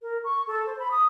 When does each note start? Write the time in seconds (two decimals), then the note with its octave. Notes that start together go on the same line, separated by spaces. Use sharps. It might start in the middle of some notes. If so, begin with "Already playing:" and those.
0.02 A#4
0.24 C#6
0.47 A4
0.66 C5
0.79 B5
0.91 D#6